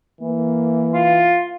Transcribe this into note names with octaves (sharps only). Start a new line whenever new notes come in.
E3 A#3
F4